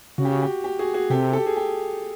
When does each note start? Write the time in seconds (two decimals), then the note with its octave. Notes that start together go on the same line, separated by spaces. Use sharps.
0.18 C#3 F#4
0.25 G4
0.32 F#4
0.42 G4
0.64 G4
0.79 F#4 G#4
0.94 F#4 G#4
1.10 C3 G4 A4
1.33 G4 A4
1.47 G#4
1.56 G4